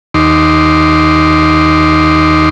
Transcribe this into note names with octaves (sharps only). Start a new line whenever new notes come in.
D#2 D#4 C6 D6